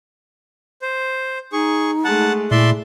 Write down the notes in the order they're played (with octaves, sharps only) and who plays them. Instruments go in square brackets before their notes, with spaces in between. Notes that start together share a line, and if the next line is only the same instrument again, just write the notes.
[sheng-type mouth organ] C5
[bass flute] D#4 [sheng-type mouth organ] G#4 C#6
[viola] G#3 A3 [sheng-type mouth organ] F#5 A5
[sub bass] A#2 [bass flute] E4 [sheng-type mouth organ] D5 E5 C6